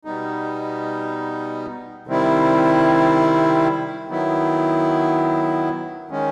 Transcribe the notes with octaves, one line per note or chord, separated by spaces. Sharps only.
B2 G3 B3 D#4
C3 D#3 G3 C4 E4
D#3 F#3 B3 E4
D#3 G#3 C#4